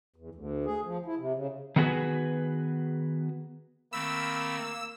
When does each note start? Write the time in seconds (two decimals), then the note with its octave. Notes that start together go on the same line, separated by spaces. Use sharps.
0.16 E2
0.35 D2
0.66 G#4
0.85 F3
1.06 E4
1.17 C3
1.35 C#3
1.76 D#3 A3 B3 F#4 G#4 B4
3.93 D#3 A3 A#3 C4 B5 E6